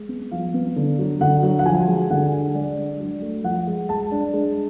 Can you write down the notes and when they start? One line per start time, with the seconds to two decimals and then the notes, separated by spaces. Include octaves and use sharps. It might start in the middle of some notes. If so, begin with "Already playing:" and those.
Already playing: G#3
0.09 B3
0.31 F3 F5
0.54 B3
0.76 D3
0.99 F#3
1.21 D3 F#5
1.43 F#3
1.59 F#5
1.66 F3 G#5
1.88 G#3
2.10 D3 F#5
2.33 G#3
2.55 G#3 D5
2.77 D4
3.00 F#3
3.22 A3
3.44 F3 F#5
3.67 G#3
3.89 G#3 A5
4.11 D4
4.34 G#3